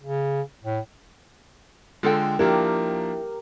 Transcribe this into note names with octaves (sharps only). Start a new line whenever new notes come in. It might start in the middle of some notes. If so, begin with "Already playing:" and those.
C#3
A2
D3 G#3 F4 A4 G5
F3 A#3 D4 E4 G4 A#4